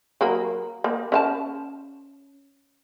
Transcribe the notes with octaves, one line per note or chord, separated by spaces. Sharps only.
F#3 A#3 B5
A#3
C#4 F5 A5